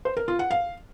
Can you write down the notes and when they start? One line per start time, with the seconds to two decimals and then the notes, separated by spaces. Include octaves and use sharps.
0.05 C5
0.17 A#4
0.28 F4
0.39 F#5
0.51 F5